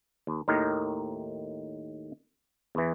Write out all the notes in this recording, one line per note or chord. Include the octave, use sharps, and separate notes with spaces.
D#2
D#2 A2 D#3 D#4 A#4
E2 E3